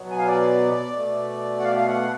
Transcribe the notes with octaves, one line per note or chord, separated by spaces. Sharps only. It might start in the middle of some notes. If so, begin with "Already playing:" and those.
Already playing: B2 F#3 B3
G#5
F5
D5
B2 A3
F#5
F5
F5
F#5